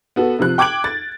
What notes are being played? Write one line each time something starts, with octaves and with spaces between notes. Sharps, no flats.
B3 F#4 A4
C3 F3 F#6
G5 D6 F#6 G#6 D7 F#7
A6